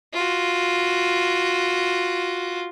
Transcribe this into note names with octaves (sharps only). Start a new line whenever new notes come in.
F4 F#4